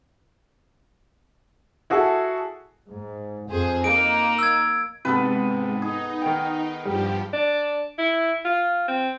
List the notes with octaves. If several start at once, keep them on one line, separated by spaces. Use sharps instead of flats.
E4 F#4 G#4 A4
G#2
F2 G#4 C5
A#3 D#4 D7
E6 G#6
G#2 C3 B3 A4 B4
D#4 G#4
D#3 G5
G2 F3 G3 G4
D4
E4
F4
C4